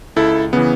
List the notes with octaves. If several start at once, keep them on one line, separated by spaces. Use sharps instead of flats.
C#2 E4 A4
C#3 E3 B3